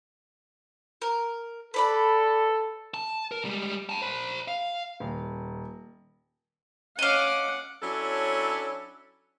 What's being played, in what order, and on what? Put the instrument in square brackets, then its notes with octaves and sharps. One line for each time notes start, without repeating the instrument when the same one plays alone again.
[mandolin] A#4
[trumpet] A4 [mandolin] B4 D5 B5
[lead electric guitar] A5
A#4
G3 G#3
G5 A5
C5 B5
F5
[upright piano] D#1
[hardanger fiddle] C#4 D6 [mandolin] D#5 F5 [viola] F#5
[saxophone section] F#3 C#4 D4 E4 A4 C#5